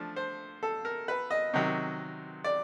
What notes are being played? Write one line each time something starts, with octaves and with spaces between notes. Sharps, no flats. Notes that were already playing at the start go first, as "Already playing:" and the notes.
Already playing: F3 A3 D4
C5
A4
A#4
B4
D#5
C3 D#3 F#3
D5